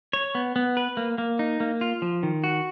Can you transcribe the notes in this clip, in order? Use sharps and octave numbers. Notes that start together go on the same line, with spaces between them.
C#5
B3
B3
B4
A#3
A#3
D#4
A#3
F4
F3
D#3
F#4